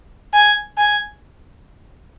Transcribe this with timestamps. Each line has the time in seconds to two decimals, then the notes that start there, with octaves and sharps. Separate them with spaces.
0.33 G#5
0.77 G#5